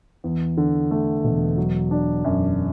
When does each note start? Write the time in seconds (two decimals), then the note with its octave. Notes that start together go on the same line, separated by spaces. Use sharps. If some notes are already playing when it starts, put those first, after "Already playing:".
0.24 E2
0.57 D3
0.91 A3
1.25 E1
1.57 F#3
1.91 D4
2.24 F#2